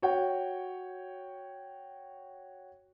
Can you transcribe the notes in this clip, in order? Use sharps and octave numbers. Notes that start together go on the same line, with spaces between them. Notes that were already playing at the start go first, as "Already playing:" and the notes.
F#4 C#5 G5